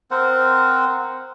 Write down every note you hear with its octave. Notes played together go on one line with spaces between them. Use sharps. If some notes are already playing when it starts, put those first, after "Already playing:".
C4 A#4 C5 F#5